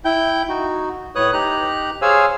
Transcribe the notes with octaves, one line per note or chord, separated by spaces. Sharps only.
E4 G5 G6
D#4 F#4
A2 B4 C#5 D#6 F#6
D#4 G4 A#5 F#6
G#4 C5 C#5 F5 G#5 E6